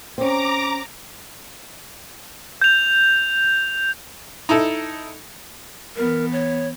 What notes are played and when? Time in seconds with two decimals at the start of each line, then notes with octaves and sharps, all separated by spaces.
0.18 C4 C#4 A#5 D6
2.61 G6 F7
4.49 D#4 E4 A4
5.96 E3 B3 A#4
6.32 C#5